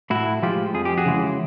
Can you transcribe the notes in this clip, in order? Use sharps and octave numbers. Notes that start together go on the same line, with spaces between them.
A2 E4 F#4
F3 G#3 F4 G4
F2 G#4
G4
F#4 G#4
C#3 E3 G#3